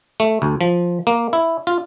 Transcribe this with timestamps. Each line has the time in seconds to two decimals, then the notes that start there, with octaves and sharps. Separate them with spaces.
0.20 A3
0.42 D2
0.61 F3
1.07 A#3
1.33 E4
1.67 F4